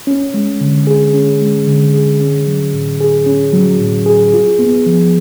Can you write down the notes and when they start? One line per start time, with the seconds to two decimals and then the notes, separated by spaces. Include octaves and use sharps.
0.07 C#4
0.34 G#3
0.61 D3
0.87 G#4
1.14 C#4
1.41 G#3
1.67 D3
1.94 G#4
2.21 C#4
2.47 F#3
2.73 A2
3.00 G#4
3.26 C#4
3.53 F#3
3.80 A2
4.06 G#4
4.33 F4
4.59 B3
4.86 F3